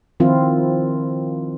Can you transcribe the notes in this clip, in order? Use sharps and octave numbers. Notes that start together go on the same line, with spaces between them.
D#3 F3 C4 E4 F4